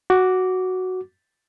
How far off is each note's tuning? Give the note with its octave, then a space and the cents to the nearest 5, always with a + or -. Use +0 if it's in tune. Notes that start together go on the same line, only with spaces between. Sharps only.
F#4 +0 D6 -10